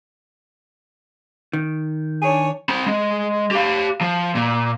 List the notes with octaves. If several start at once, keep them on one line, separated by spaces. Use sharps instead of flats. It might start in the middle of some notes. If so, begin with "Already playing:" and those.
D#3
D4 C#5 G#5
C4 B5
G#3
G4 F5
F3
A#2